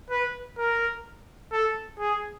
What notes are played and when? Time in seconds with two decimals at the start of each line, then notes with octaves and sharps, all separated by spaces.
0.10 B4
0.58 A#4
1.52 A4
1.99 G#4